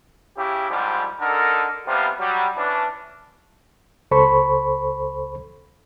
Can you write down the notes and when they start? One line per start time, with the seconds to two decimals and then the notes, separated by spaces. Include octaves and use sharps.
0.37 C#3 E4 G4
0.70 G#2 D3 F3 G3
1.20 D3 D#4 A4 A#4
1.87 C3 F3 G3 B3 F4
2.19 F#3 G3
2.56 E3 C#4 D4
4.11 C#2 A4 C5 B5 C#6